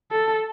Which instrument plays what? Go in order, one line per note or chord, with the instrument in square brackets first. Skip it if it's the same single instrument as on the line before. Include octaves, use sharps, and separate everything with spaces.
[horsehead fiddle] A4